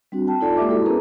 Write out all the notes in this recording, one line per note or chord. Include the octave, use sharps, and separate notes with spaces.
G3 C4 D4 F#4
G5 A5
D#4 F4 A4 D5 A5
G#3 A#3 G4 D5 E5 D6
E4 F#4 A4
B3 C#4 G#4 A#4 B4 A#5